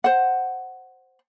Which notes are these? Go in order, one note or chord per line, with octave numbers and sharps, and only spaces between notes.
C5 F#5